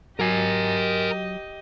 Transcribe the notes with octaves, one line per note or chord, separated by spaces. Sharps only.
F#3 G4 A#4 D#5 G#5